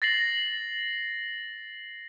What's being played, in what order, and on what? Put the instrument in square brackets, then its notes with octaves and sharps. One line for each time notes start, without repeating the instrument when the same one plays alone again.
[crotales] A6 A#6 C7 F#7